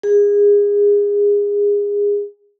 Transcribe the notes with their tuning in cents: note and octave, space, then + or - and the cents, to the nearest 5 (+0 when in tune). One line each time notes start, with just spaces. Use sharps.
G#4 -25